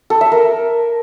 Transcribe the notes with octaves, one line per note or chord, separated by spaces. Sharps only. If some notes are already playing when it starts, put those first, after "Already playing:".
A4
E5
A#4